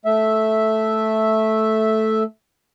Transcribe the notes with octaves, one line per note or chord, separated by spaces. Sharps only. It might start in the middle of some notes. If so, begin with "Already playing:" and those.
A3 E5